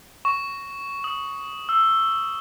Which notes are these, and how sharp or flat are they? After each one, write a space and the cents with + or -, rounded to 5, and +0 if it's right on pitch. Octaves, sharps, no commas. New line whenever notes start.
C#6 +10
D#6 +15
E6 +10